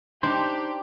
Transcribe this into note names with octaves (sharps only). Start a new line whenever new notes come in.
D4 D#4 G4 C5